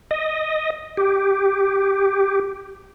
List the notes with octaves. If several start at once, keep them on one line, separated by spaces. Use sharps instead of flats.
D#5
G4